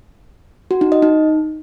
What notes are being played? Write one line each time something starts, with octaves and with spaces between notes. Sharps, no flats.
F#4
D#4
D#5
D#4